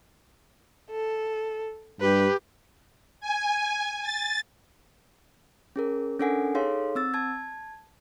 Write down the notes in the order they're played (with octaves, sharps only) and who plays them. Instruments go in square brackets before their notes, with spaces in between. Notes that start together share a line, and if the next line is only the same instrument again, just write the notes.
[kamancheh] A4
[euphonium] G2 [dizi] G4 [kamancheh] B4
[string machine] G#5
A6
[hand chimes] C#4 G#4 A#4
C#4 D4 A4 A#4 F#5 G#5
D#4 G#4 A4 C#5 F5 C6
C4 E6 A6
A5 G#6